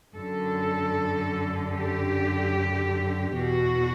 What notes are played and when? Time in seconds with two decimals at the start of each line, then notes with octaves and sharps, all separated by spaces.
0.16 F#2 D3 A4
1.76 G4
3.37 E2 B2 F#4